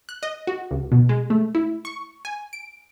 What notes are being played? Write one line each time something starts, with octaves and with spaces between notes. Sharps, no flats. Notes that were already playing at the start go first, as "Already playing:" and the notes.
F#6
D#5
F#4
C#2
B2
G#3
A3
E4
C#6
G#5
D7